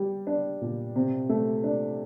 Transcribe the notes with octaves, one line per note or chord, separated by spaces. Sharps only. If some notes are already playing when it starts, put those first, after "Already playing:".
Already playing: G3
D4
A#2
C3
A3
D4